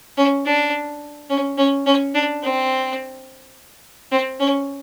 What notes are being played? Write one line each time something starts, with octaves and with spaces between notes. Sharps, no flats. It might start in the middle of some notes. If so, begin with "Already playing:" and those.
C#4
D4
C#4
C#4
C#4
D4
C4
C4
C#4